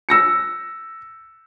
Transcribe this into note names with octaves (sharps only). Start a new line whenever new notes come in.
E6 A#6 C#7